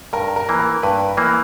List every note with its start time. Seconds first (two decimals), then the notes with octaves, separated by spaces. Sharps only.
0.13 G2 A#4
0.36 A#4
0.49 E3 A#3
0.59 A#4
0.83 G2 B4
1.17 E3 A#3